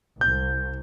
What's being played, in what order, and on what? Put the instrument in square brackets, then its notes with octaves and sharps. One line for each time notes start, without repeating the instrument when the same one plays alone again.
[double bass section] C2 [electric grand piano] G6